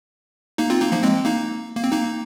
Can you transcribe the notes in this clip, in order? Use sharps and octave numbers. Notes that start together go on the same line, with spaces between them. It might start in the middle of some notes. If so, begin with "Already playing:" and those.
A#3 D#4
C4 F4
A#3 D#4
F3 A#3
G#3 C4
A#3 D#4
A#3
C4
A#3 D#4